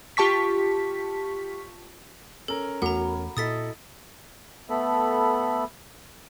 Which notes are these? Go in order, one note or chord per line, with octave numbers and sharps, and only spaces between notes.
F4 G4 A5 C#6 B6
C#4 A4 A#4
E2 A3 F#4 F#5 A#5 B5
A#2 E4 A4 D#5 D#6 A6 B6
A3 B3 A4 B5